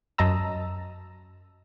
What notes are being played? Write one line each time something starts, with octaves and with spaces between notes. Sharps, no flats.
F#2 D#5 A5 A#5 E6